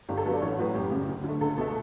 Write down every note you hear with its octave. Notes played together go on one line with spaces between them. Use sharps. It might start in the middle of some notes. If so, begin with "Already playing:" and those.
G1 G4
A4
G2 F#3 B3 B4
D5
A1 C#5
A2 F#3 B4
F#2 G4
C#3 G3
D2
D3 A3
C#2 A4
B2 A3 A4